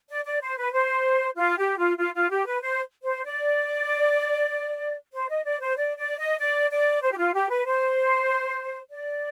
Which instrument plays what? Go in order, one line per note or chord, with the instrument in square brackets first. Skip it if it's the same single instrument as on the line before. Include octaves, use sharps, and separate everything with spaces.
[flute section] D5
D5
C5
B4
C5
F4
G4
F4
F4
F4
G4
B4
C5
C5
D5
C5
D#5
D5
C5
D5
D5
D#5
D5
D5
C5
G4
F4
G4
B4
C5
D5